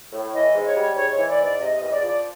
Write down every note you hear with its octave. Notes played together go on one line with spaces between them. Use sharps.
A2
E3 D#5
G#2
C#5
G3
G#2 C#5
C#5
E3
D5
G#2 D5
C3 D#5
D#5
E2
D#5
D5
F3
D5